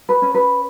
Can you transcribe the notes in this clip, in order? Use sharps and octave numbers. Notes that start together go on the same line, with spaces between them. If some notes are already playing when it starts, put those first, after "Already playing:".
B4
C#4
B4